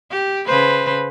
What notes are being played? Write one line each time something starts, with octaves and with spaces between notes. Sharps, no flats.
G4
C#3 B4 C5